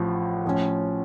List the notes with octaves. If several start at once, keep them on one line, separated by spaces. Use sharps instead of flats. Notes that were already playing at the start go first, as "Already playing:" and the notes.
Already playing: A1 A2 F3
A2 F3 C#4